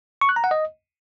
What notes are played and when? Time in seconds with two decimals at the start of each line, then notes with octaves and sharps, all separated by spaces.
0.21 C#6
0.29 F#6
0.36 A#5
0.44 F#5
0.51 D#5